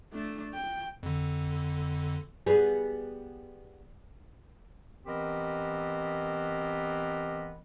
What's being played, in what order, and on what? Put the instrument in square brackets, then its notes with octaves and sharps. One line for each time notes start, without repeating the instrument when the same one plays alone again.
[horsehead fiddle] A3 D4
G5
[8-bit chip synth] F2 D3
[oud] G3 B3 G#4
[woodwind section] E3 B3 C4 G4 A#4 D#5